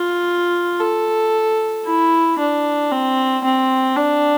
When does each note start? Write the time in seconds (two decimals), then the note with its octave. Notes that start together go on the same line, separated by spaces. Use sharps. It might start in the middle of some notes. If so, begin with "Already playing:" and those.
Already playing: F4
0.80 A4
1.85 E4
2.39 D4
2.91 C4
3.44 C4
3.97 D4